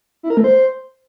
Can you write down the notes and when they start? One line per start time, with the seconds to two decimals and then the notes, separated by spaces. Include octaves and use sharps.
0.23 E4
0.30 A#4
0.37 A3
0.44 C5